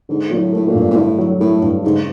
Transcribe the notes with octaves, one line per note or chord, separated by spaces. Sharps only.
G#2 D3
A#2 F#3
A2
A2 A3
A#2
G2
A#2
A2 D3
F#3
A2 A3
G2
G#2 C#3